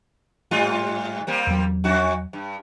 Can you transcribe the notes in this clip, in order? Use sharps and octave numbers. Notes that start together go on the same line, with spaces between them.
G#2 G3 F4
G3 A#3 C4
E2 F#3
F2 F#4
G2